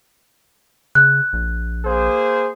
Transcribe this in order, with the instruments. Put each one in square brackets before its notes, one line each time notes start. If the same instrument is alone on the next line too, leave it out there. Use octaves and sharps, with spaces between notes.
[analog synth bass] C#3 [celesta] F#6
[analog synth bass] A#1
[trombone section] A#3 G#4 C5